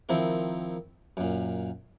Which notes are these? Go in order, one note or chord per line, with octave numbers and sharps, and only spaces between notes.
D#3 F3 C4 E4 A#4
F#2 A#2